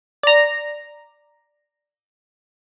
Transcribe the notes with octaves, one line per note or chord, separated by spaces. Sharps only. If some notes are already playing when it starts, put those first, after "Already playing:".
D5 A#5